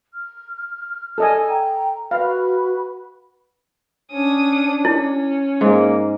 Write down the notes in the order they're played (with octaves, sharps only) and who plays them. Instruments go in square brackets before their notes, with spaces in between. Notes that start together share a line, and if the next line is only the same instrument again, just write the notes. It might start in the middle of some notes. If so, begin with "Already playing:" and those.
[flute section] F6
[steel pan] A4 D#5 G#5
[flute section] G5 A#5
[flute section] F#4 B4 B5 [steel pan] F5
[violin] C#4 D#6 [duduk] D4
[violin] C#4 [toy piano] E4
[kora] G#2 [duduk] A#3